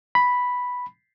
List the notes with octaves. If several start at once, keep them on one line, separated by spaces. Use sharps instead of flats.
B5